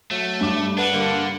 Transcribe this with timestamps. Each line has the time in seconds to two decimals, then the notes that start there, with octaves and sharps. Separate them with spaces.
0.11 F#3 A3
0.41 G2 D6
0.78 D4 B4 F#5
0.94 D3 A#3